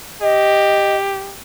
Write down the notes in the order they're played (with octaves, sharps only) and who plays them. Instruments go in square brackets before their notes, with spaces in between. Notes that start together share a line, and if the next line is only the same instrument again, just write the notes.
[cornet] G4 [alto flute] D#5